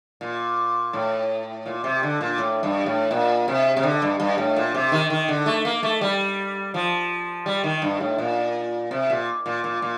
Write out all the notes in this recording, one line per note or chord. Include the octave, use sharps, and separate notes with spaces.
A#2
A2
A#2
C3
D3
A#2
A2
G2
A2
A#2
C3
C3
D3
G2
G2
A2
A#2
C3
D#3
D#3
D3
A3
A#3
A3
G3
F3
G3
D#3
G2
A2
A#2
C3
A#2
A#2
A#2
A#2